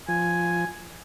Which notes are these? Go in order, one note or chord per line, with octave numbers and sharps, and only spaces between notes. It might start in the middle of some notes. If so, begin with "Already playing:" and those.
F3 G#5